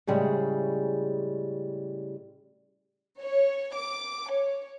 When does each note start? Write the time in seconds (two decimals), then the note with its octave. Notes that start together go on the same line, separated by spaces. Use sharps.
0.07 A2 C#3 G3 G#3
3.19 C#5
3.74 D6
4.30 C#5